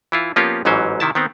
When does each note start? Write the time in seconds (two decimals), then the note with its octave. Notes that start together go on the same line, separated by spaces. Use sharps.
0.12 E3 E4 F4
0.36 F3 A#3 B3 C#4 F4 G4
0.65 A1 G#2 E3 F#3 C#4 C5
1.00 C3 D#3 E4 A5
1.15 D#3 B3 C4